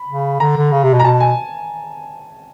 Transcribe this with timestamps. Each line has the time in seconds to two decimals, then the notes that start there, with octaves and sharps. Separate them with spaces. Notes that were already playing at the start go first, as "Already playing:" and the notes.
Already playing: B5
0.08 C#3
0.40 D3 A#5
0.57 D3
0.72 C#3
0.83 C3
0.94 B2
1.00 A#5
1.04 B2 A5
1.20 G#5